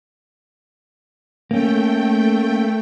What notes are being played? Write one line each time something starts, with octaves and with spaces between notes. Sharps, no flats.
A3 A#3 C#4 G5